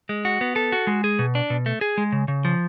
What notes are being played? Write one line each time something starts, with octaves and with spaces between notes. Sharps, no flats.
G#3
F#4
B3
A4
F#4
G#3
G#4
B2
D4
B2
A3
G#4
G#3
C#3
C#3
F3